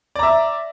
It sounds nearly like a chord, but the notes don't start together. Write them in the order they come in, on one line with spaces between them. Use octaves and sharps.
D5 A#5 E5